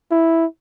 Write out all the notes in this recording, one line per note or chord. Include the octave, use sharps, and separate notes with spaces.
E4